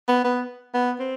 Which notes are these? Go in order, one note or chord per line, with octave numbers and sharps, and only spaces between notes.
B3
B3
B3
C4